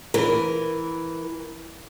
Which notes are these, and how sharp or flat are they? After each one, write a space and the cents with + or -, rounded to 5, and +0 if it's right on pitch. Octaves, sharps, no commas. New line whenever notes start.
E3 +0 A#4 +0